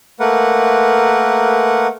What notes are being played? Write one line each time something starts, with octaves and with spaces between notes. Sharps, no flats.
A3 A#3 A#4 B4 F#5